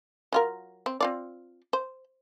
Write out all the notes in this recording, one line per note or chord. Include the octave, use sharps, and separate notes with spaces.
F#3 F4 A#4
C4
C4 F4 D5
C5